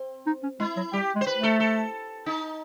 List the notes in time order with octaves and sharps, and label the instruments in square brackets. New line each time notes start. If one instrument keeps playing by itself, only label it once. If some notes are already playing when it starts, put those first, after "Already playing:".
Already playing: [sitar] C4
[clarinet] D#4
C#4
[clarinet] G#3 [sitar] E4
[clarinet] F#3
[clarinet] G3 [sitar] G4
[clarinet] G#3
[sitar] C5
B4
[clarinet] A3
[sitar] A4
A4
D#4